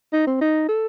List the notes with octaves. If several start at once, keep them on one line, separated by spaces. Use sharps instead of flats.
D#4
C4
D#4
A4